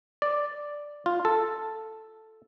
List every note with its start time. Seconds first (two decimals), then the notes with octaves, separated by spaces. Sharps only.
0.22 D5
1.06 F4
1.25 A4